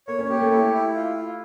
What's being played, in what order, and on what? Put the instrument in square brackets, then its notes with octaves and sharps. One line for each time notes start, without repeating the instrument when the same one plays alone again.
[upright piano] A#3 [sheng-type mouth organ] C#5
[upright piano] C#4
[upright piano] A#3 [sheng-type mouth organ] G4
[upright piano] A3
[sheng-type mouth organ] E4
E4
F4
F4